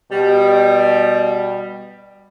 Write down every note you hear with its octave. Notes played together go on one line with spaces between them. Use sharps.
B2 G3